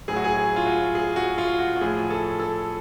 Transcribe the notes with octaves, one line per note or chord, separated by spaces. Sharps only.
A2 F#3 G#4
F#4
G#4
G#4
F4
F#4
G#4
F#4
F4
F#4
F#4
A2 F3 G#4
A4
A4